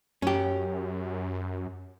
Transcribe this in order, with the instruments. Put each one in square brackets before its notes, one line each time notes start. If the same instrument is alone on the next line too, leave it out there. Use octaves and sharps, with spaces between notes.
[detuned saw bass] F#2 [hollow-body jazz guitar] C#4 G4